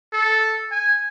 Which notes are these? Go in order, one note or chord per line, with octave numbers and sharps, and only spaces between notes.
A4
G#5